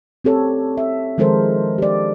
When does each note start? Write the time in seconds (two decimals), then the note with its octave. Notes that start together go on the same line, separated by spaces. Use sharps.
0.25 C4 G4 A4 C#5
0.77 E5
1.18 D#3 F3 G#3 A4 A#4 C5
1.78 G4 D5